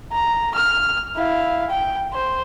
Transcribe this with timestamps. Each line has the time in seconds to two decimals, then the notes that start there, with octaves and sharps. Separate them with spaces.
0.12 A#5
0.54 F6
1.16 E4 F5
1.69 G5
2.13 C5